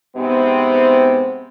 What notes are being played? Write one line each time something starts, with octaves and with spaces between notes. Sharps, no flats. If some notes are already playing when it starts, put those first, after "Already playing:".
G#2 C3 B3 C4